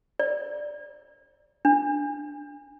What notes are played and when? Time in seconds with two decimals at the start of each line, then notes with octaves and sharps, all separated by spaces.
0.20 D5
1.65 D4